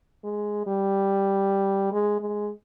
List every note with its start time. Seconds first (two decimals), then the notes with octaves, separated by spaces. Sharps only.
0.24 G#3
0.66 G3
1.92 G#3
2.20 G#3